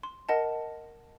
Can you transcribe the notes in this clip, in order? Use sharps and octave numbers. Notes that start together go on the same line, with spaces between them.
C6
A#4 D#5 F#5 A5